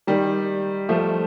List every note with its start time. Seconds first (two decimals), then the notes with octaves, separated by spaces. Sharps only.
0.07 D#3 G3
0.89 F3 A3